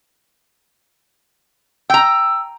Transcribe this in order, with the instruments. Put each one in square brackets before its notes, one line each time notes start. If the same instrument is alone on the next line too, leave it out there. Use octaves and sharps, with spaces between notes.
[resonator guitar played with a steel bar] G5 A#5 [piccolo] E6